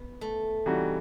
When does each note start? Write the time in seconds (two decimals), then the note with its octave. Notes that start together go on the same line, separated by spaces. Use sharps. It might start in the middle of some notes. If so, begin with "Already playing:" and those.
Already playing: B3
0.21 A3
0.66 C3 E3 G3 D#4 F#4